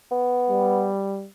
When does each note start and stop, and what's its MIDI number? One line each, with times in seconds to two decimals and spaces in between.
0.11 0.88 59
0.49 1.27 55